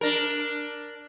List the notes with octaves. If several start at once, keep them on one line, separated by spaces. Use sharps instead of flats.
D4 A#4